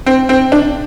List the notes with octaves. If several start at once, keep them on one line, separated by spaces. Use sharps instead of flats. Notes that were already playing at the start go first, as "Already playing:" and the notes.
C4
C4
D4